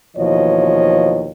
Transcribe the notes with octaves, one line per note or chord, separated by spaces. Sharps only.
D#2 B2 E3 F3 C#5 D#5